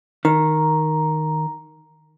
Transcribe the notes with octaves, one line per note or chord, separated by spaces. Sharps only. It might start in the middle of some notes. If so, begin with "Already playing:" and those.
D#3 A#5